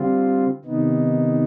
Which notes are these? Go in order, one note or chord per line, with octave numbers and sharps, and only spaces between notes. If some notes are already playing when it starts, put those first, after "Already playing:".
Already playing: D3 G3 C4 F4
C3 D#3 B3 D#4